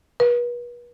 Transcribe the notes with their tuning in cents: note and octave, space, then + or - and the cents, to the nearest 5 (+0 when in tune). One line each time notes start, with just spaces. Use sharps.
B4 -40